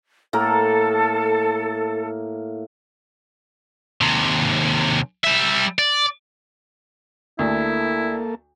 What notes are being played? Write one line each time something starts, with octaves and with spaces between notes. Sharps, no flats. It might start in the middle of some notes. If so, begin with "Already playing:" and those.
A2 A#3 A4 A#4
D#2 C3
G3 E5
D5
D2 A#3 E4 A4